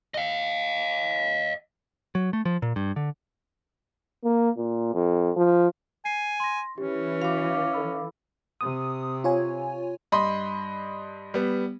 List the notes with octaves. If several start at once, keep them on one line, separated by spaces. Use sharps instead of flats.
D#5 F5
F#3
A3
F3
A#2
G2
D3
A#3
A#2
F2
F3
G#5 C7
C6 A#6
E3 C#4 G4
F#4 F5 D6
A4 B5 E6
C3 D#6
F4 C#5 G#5
G2 D#5 B5 C6
G3 B3